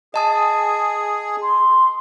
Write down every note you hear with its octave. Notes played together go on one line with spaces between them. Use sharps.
G#4 D#5 A5 D#6
C6